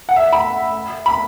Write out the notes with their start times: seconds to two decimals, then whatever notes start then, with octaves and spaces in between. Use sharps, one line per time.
0.09 F#5
0.16 E5
0.33 B5
1.06 B5